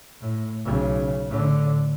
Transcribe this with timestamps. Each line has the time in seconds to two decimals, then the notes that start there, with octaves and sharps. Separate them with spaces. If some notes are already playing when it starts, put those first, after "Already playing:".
0.21 A2
0.64 B1 C#3
1.29 A2 D3